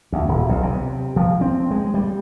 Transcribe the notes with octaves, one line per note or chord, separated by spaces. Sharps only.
D2
D#1
B1
C3
F3
C4
G#3
G3